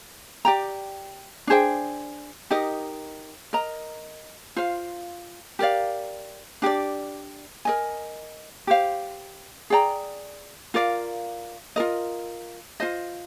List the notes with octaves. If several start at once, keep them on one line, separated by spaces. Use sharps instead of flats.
G4 D5 G5 A#5
D4 G#4 C5 G5
D#4 G4 A#4 D#5
A#4 D#5 A#5
F4 C5 F5
G4 A#4 D5 F5
D4 G4 D5
A#4 D#5 G#5
G4 C5 F5
G#4 D5 G5 A#5
F4 A#4 D5 F5
F4 A#4 D#5
F4 C5 D#5